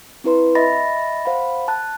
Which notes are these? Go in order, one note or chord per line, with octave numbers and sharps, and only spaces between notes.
C4 E4 B4 C6
D#5 E5 B5 A6 A#6
C5 F5 F#5 B5
A5 F#6